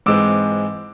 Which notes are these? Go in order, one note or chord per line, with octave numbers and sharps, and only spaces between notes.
G#2 E3 G#3 C4 D6 E6